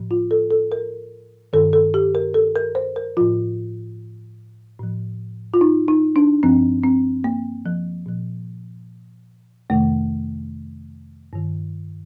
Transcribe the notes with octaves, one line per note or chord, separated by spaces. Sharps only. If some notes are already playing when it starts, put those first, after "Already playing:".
Already playing: A2 F3
F4
A4
A4
A#4
G2 D#3 A4
A4
G4
A#4
A4
A#4
C5
A#4
A2 F3 F4
A2 F3
F4
D#4
D#4
D4
G2 F3 C4
C4
A#3
F3
A#2 F3
F2 C3 D#3 A3
G2 D#3